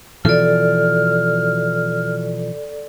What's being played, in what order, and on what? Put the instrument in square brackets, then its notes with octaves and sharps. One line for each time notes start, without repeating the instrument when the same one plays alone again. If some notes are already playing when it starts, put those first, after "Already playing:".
[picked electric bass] B2 E3 F3 [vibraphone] A4 D5 [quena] F6